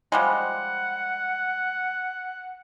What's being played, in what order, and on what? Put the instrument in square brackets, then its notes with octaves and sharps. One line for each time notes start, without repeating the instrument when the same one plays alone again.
[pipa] F3 G3 G#3 [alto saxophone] F#5